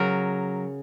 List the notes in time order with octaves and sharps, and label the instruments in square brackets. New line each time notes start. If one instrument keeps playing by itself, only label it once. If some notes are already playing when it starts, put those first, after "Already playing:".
Already playing: [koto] C#3 F#3 A#4